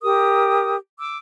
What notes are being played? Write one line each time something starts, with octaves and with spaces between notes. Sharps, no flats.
G4 A#4 D#6
D6 E6